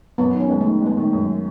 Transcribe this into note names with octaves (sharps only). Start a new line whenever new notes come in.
F#2 B3
D#3
C#4
G#3 B3
A3
D#3
G#3 B3
D#3 A3
F#2 G#3